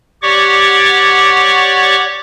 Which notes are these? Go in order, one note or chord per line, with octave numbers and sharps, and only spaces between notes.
G4 C#5 D5 F#5 C#6 D6